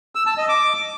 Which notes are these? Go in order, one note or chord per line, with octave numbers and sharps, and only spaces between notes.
E6
A5
D#5
D6